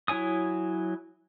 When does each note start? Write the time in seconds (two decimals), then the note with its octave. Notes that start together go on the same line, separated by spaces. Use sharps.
0.08 F#3 E4 C#5 G#5 D#6